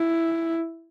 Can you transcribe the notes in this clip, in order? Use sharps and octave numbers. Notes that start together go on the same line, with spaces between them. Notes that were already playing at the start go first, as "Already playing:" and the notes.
Already playing: E4